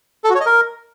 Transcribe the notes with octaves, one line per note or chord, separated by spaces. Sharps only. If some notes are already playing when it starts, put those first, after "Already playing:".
A4
F#4
C#5
D#5
A#4